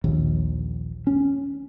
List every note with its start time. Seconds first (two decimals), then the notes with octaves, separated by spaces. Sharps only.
0.04 A#1 D#2
1.07 C#4